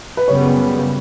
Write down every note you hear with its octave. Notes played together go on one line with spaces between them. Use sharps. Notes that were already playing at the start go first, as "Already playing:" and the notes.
B4
F#2 C#3 G3 B3 C#5